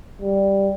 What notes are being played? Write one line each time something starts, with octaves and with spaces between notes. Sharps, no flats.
G3